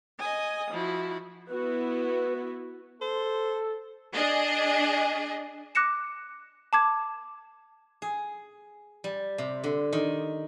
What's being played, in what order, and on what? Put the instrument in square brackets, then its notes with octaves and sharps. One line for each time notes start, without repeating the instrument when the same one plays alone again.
[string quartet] D#5 G#5 D#6
F3 E4 F#4
[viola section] B3 E4 F#4 [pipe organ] B4
[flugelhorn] A4 [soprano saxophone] C5
[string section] D4 G#4 D#5
[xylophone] D6 F#6 A#6 C#7 E7
A5 D6 G#6
[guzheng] G#4
G3
C3
D3
D#3